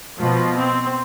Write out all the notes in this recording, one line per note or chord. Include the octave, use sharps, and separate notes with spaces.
B2 F3
C4